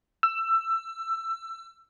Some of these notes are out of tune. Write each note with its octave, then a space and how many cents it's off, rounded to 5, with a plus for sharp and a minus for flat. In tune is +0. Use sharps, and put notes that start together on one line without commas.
E6 +20